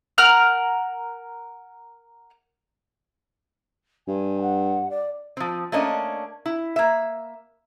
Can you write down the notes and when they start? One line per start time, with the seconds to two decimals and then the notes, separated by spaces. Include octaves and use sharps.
0.18 A#4 F#5 F6
4.08 G2 G#5
4.41 F#5
4.90 D5
5.37 F3 C4
5.72 A3 A#3 C#4 D4 D#5
6.46 E4
6.76 A#3 E5